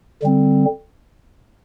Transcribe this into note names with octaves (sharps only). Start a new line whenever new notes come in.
D3 G3 C4